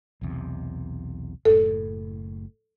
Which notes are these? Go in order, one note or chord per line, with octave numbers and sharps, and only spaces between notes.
B1 E2 C3
F#1 A2 A4